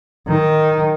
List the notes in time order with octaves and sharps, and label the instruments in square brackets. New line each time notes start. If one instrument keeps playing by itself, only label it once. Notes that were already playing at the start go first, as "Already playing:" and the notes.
[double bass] D#3